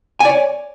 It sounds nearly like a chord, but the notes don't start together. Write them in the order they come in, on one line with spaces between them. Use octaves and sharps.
G#5 D5 C#5